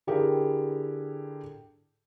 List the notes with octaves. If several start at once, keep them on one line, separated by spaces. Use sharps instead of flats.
D3 E4 G4 G#4 A#4